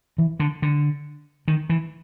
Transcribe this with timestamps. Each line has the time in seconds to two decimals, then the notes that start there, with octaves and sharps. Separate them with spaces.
0.18 E3
0.40 D3
0.62 D3
1.48 D#3
1.70 E3